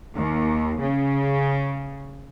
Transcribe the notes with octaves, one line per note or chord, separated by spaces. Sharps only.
D#2
C#3